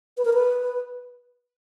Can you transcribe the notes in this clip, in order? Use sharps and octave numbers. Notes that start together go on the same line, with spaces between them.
B4
A#4
B4